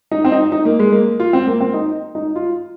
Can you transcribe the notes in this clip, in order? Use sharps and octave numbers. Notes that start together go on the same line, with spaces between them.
D#4
C4
D#4
D#4
A#3
G#3
A#3
F4
C4
A#3
C4
D#4
D#4
F4